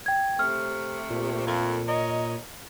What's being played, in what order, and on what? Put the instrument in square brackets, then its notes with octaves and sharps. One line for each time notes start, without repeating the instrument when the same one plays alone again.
[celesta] G5 G#6
[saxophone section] C3 A3 [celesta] F6
[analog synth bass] A#2
[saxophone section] F2 A3 F4
A#4 C#5 D#5